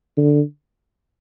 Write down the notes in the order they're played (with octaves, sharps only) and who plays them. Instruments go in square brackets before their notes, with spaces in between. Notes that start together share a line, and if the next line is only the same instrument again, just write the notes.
[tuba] D3